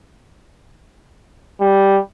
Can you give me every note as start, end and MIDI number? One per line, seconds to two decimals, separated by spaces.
1.61 1.99 55